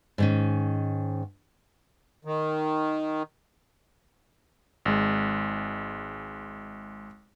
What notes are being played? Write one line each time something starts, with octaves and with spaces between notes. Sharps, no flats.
G#2 D#3 C#4
D#3
G#1 G#3